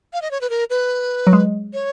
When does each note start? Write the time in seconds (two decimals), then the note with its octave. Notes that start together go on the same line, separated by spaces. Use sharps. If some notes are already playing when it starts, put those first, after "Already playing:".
0.13 F5
0.22 D#5
0.31 C#5
0.41 B4
0.50 A#4
0.70 B4
1.27 F#3
1.33 G#3
1.73 C#5